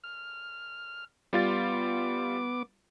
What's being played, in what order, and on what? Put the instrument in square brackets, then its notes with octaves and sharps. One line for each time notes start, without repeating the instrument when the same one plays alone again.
[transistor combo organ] F6
[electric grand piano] G3 F4 A6 [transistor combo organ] B3 D6